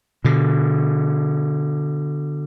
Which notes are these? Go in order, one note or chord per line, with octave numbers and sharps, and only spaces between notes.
B2 D3